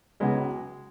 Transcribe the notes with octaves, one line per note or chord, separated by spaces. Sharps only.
C#2 C#3 F#3 G#3 B3